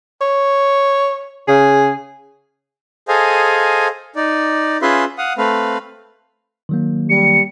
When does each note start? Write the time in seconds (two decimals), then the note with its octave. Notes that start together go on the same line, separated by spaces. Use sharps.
0.21 C#5
1.48 C#3 G#4
3.08 G#4 A4 C5 D#5 F5 G#5
4.16 D#4 D5
4.82 C#4 F4 G#4 B4 E5 C6
5.18 F5 F#5 D#6
5.38 A3 C4 B4 F5
6.69 D#3 F#3 A#3
7.10 G3 C#7